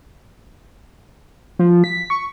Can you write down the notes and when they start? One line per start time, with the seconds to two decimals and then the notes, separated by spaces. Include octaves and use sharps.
1.59 F3
1.84 B6
2.10 C#6